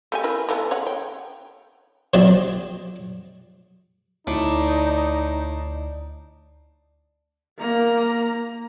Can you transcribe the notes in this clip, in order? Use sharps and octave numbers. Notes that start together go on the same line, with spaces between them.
A3 G4 G#5
E4 A#4 B4
D3 E3 B3
C#5 F#5
G5
F3 F#3 A#3 C4 D4 D#5
D2 A2 D4 D#4
A#3 A#5